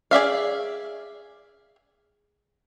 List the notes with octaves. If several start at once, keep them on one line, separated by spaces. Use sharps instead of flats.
G#4 D5 E5 F5